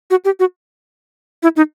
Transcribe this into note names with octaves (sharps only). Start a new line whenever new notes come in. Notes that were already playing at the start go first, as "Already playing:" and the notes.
F#4
G4
F#4
E4
D#4